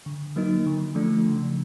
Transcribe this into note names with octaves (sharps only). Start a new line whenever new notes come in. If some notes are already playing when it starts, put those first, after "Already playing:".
D3
F#3 A#3 D#4
D3
F3 A3 D4
C#3